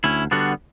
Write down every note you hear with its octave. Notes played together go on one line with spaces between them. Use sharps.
D2 C#4 E4
D3 G3 B3 D4 F#4